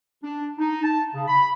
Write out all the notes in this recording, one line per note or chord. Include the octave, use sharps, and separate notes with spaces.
D4
D#4
A5
C#3
B5